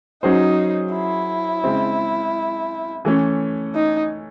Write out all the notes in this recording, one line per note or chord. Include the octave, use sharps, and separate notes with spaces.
F#3 C#4 D#4 G#4 C5
E4
C#3 G#3 C4
E3 A3 C#4
D#4